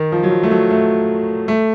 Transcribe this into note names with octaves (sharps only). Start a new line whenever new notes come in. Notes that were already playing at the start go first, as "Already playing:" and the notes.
Already playing: D#3
F3
F#3
F3
A3
F#3
A3
A3